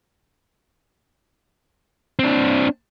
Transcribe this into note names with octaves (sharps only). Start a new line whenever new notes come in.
C4 D4